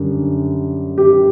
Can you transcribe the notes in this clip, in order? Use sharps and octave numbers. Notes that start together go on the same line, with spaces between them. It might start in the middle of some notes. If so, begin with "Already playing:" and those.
Already playing: F#2 D3 G3
G4